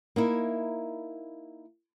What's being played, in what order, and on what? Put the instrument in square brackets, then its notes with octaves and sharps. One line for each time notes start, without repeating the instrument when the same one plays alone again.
[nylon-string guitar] A#3 D#4 E4